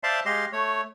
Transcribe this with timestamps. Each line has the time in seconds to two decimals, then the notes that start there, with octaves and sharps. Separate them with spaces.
0.03 C5 D5 E5 F5 A5 C6
0.26 G#3 G4 D#5 F5 C6
0.53 A3 C#5